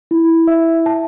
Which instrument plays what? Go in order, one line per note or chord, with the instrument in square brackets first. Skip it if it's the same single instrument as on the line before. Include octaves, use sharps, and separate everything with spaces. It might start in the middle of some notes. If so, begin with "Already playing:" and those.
[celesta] E4
E5
A5